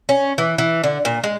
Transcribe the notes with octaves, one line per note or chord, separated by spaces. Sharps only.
C#4
E3
E3
D3
A#2
G#3